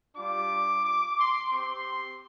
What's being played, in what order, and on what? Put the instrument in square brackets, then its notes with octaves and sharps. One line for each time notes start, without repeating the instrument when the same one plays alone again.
[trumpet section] G3 D4 F4 D6
D6
C6
C4 G4 C6